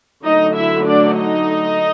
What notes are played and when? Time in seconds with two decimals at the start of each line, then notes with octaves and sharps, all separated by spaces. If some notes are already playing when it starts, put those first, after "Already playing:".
0.24 D3 F#3 A3 D#4 D#5
0.55 E4 E5
0.86 D4 D5
1.17 D#4 D#5